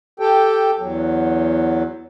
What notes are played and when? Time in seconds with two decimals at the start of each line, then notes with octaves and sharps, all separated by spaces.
0.20 G4 A4 G5
0.79 E2 F#3